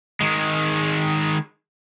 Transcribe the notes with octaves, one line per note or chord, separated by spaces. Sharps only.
D#3 G#3